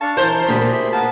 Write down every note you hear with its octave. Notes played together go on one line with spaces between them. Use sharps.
D4 F5 A5 C#6
E3 A#4 C5 F6
D2 A#2 D4 G4 G#4 B5
A#3
E5
B3 F4 A#4 A5